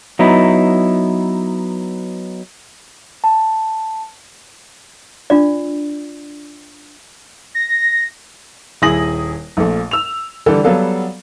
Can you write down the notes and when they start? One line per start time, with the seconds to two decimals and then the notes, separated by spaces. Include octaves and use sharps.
0.19 F#3 B3 D#4 E4
3.24 A5
5.30 D4 F4 D5
7.55 A#6
8.82 D#1 E4 G#4 D#6 A#6 F#7
9.57 A#1 A#2 A3
9.91 E6 F7
10.46 D3 E3 G3 A4
10.64 F#3 G3 B3 A4 F5